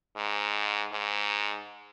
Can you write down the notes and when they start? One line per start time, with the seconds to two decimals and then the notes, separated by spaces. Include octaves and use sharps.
0.16 G#2
0.92 G#2